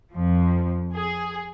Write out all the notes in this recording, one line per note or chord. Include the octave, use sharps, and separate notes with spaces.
F2 F3
G#4